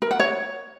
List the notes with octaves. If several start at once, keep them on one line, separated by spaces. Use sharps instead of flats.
A#4
F#5
C#5